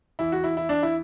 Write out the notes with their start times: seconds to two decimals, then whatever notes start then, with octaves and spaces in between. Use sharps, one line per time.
0.19 E2 E3 E4
0.32 F#4
0.44 E4
0.57 E4
0.69 D4
0.83 E4